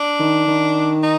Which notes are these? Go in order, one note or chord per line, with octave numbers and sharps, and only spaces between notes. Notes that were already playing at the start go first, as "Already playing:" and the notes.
Already playing: D4
D#3
D#3
D#4